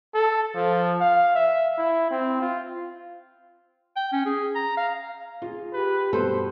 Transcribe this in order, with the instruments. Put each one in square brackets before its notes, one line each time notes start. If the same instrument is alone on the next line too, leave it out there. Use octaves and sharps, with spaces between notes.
[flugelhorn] A4
F3
F5
E5
E4
C4
F4
[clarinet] G5
C#4
G#4
A#5
F5
[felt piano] F4 G#4
[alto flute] G4 [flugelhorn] B4
[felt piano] G2 B2 C6 [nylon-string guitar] A4 [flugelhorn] C5